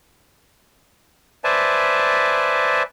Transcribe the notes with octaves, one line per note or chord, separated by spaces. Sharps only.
B4 C5 D5 E5 G#5 A5